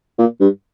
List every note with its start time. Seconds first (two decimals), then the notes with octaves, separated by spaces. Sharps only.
0.18 A#2
0.41 G2